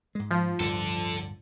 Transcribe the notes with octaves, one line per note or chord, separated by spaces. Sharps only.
G#2 G#3
F3
D1 G2 A4 D5